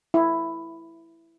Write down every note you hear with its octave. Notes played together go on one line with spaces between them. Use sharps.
E4